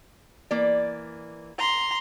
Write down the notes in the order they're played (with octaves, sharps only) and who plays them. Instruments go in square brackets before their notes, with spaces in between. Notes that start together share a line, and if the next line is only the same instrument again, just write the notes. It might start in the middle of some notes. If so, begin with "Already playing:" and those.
[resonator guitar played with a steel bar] E3 A#3 D5
[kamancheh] A#5 C6